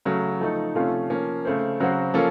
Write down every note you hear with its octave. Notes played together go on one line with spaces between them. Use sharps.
C#3 F#3 A3
F3 A3 D#4 A4
C3 F3 A3 C#4 F4
F3 A#3 C#4
C#3 A3 C4
C#3 F#3 C4 F#4
F3 A#3 C#4 A4